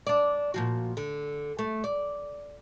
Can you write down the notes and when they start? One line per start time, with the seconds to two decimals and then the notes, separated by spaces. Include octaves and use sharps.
0.07 D4 D5
0.54 A#2 F3 F#4
0.97 D3
1.59 A3
1.84 D5